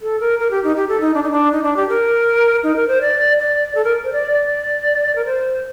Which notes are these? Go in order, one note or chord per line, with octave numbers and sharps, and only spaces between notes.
A4
A#4
A#4
G4
D#4
G4
A4
D#4
D4
D#4
D4
D#4
D4
G4
A#4
D#4
A#4
C5
D5
D5
A4
A#4
C5
D5
D5
A#4
C5